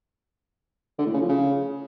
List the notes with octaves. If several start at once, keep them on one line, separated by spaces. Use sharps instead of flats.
D3
A2
C#3
F3
C#3